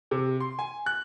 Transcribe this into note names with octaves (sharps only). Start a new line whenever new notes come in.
C3
C6
G#5
F#6